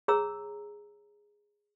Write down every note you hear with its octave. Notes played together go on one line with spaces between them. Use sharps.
G#4 C#5 A#5 E6